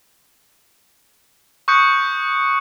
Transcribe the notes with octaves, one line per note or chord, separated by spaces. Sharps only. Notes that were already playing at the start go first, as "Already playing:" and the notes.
C#6 D#6 F#6 G6 C#7